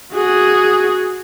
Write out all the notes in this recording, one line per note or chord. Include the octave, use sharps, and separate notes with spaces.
F#4 G#4